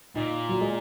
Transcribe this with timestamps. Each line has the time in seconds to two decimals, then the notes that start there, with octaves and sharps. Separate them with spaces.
0.16 A#2 D#4
0.49 F#3
0.61 G#3